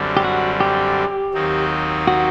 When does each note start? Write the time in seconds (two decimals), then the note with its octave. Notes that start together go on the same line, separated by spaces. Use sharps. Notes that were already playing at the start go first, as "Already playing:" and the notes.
Already playing: F#2 D3 G3 C4
0.17 G4
0.24 F#4
0.60 G4
1.34 D#2 D#3 F#3 C4 D#4
2.08 F#4